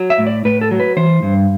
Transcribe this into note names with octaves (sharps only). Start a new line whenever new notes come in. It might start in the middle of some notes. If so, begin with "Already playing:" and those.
Already playing: F#3
E5
A2
D5
A2 B4
A4
F#3
B4
E3 C5
G2